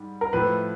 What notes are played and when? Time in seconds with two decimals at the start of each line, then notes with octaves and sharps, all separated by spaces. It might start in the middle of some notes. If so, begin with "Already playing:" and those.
Already playing: G#2 G3
0.21 A#4
0.33 A2 F3 A3 B4